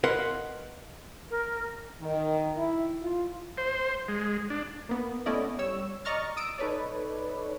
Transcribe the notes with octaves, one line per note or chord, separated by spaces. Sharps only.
A#4 B4 D#5 F5 F#5 C6
A#4
D#3
E4
F4
C5
G#3
D4
A#3 B3
A3 B3 C#4 E4 D5 D#5
G3 C#5 E6
D5 D#5 A#5 C#6 F6 A6
D#6 E6 D7
D#4 A4 B4 C#5 D5